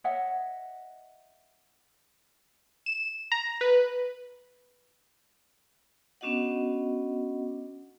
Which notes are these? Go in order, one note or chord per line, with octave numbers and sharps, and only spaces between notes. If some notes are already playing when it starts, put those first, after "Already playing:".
C#5 D#5 E5 F#5
E7
A#5
B4
B3 C#4 D4 F#4 D#5 F#5